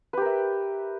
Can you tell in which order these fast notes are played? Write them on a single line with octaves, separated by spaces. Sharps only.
B4 G4 A#4 E5